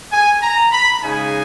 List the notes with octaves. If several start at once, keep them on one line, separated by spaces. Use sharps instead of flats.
G#5
A#5
B5
C#3 G#3 D#4 G#5